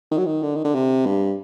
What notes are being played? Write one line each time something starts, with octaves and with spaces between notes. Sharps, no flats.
D#3
F#3
D#3
D3
D#3
D3
C3
G2